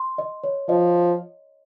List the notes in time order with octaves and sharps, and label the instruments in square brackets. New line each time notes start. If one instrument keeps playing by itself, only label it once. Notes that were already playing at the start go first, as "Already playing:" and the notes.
Already playing: [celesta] C6
D#5
C#5
[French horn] F3 [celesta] D#5